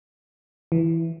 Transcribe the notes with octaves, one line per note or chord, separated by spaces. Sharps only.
E3